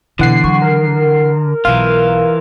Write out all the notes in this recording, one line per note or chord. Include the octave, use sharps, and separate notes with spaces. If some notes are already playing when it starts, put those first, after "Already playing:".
B2 D3 E3 F#5 C7
F#3 C#6
A#4
B1 E3 F4 F5